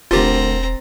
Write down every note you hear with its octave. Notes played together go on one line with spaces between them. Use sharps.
E1 D2 C4 F4 G4 A#4 A#5 A6